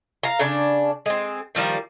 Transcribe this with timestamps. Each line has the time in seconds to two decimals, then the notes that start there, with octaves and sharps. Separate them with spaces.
0.23 F5 A#5
0.39 C#3 D4
1.06 G#3 C4
1.55 D#3 F3 G3 A#3